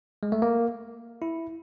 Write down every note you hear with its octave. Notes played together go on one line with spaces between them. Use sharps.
G#3
A3
A#3
E4